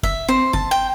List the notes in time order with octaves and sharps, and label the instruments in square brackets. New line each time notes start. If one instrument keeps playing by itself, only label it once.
[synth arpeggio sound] G1 [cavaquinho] E5
[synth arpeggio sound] C4 [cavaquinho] C5
[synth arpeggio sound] G1 [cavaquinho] A5
[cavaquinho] G5